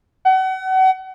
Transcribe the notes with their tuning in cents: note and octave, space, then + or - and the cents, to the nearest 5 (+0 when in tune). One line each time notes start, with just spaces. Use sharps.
F#5 +35